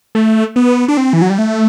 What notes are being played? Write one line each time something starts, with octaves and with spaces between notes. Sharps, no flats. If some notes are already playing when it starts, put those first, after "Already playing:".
A3
B3
D4
C4
E3
F#3
G3
A3